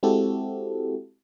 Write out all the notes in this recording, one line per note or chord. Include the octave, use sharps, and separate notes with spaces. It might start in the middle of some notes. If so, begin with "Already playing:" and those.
G#3 C4 E4 F#4 G4 A4